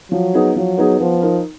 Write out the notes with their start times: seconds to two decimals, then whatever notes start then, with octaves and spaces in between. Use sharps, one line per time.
0.11 F3 F#3
0.34 B3 D#4 G#4
0.56 F3 F#3
0.78 B3 D#4 G#4
1.00 F3 B3
1.22 D#4 A#4